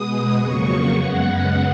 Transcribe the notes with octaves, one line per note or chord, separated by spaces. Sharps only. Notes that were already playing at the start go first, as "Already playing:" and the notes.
Already playing: B2 G#3 B3 D#6
F2 C#3 F#3 A#3 C#6
F#2 C#3 G#3 B3 F#5